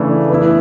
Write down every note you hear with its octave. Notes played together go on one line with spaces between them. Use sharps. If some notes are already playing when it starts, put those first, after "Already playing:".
Already playing: C#3 E3 A3 D4
E3 B3 E4